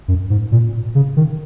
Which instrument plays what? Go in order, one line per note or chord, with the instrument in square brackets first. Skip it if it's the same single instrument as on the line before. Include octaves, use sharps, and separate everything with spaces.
[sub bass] F#2
G#2
A#2
C#3
D#3